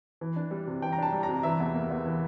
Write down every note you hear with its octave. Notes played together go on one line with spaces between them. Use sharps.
E3
D4
G3
C3
E3 G5
A#5
D4 A5
G3
A#5
C3
E3 E5
E2
A#3
E2
E3